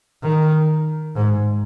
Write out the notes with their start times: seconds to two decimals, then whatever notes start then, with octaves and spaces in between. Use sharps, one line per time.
0.23 D#3
1.16 G#2